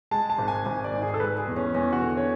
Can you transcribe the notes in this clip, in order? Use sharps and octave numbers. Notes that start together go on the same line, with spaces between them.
G#3 A5
A5
G#1
G#5
G#1 G#5
D5
G#2
G#4
A4
G#3 B4
G#4
E2
C#4
E2 C#4
F#4
D3
C#5